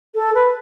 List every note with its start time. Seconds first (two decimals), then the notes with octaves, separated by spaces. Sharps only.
0.14 A4
0.34 B4